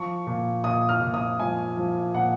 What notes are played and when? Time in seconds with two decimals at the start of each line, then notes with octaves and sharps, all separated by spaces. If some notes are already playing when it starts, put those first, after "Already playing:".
Already playing: F3 C#6
0.27 A#2
0.64 A#2 D#6
0.89 F6
1.02 A#2
1.14 D#6
1.39 F3 G#5
1.77 F3
2.14 A#2 F#5